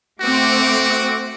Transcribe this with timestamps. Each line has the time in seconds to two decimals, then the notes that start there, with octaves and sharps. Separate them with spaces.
0.20 A3 C4 F#4 D6